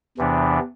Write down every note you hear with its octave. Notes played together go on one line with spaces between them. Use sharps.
E2 C3 E3 B3 D4